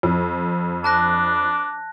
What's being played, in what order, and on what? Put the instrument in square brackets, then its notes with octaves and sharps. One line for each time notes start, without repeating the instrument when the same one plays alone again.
[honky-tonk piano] F2
[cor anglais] D4 [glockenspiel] A5 F#6 A#6